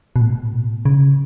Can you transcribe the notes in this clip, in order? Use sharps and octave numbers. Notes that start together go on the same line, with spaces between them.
B2
A2
B2
C#3